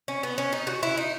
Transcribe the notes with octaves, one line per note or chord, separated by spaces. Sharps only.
C#4
B3
C#4
D#4
F#4
E4
D#4